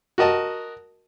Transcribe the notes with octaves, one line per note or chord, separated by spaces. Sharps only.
F#4 A#4 D#5 A5